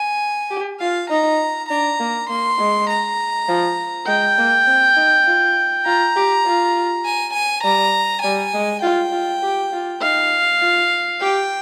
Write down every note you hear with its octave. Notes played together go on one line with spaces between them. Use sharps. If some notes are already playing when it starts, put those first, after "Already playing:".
Already playing: G#5
G4
F4 F5
D#4 A#5
D4 A#5
A#3
A#3 C6
G#3
A#5
F3
G#3 G5
A#3
C4
D#4
F4
F4 A#5
G4
F4
G#5
G#5
G3 A#5
G3 G#5
G#3
F4 G5
F4
G4
F4
D#4 F5
F4
G4 G5